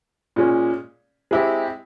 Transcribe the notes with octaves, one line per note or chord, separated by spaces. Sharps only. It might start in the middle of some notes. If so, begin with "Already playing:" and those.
A#2 G#3 C#4
G#3 C4 E4 G4